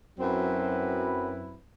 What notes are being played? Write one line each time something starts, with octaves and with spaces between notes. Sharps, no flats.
F#2 F#3 C4 E4 B4